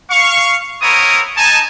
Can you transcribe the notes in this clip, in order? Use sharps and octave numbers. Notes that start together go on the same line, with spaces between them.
F5 C#6
B3 C4 E4 A#4 C#5 D#6
D#4 G#5 A5